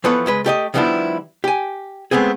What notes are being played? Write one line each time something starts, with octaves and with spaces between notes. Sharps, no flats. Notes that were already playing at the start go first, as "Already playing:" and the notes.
E3 F3 B3 A4 B4 C#5
C#2 G#3 B4
A3 G4 D5 D#5
D#3 F3 G3 B3 D4 E4
G4 G#5
G#3 A3 B3 C4 G#4